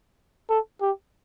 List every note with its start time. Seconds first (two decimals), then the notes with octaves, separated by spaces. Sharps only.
0.49 A4
0.81 G4